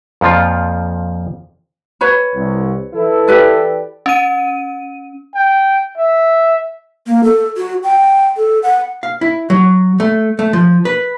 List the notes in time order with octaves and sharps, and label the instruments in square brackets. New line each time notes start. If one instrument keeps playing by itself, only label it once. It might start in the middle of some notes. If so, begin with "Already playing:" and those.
[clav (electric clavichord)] F2 A#2 F3 F4
[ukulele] B4 C#5 B5
[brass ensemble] C2
E3 E4 A4
[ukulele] G4 B4 D5
[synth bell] C#4 D#7
[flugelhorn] G5
E5
[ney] A#3
A4
F#4
G5
A4
F#5
[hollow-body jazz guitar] F5
E4
F#3
A3
A3
F3
B4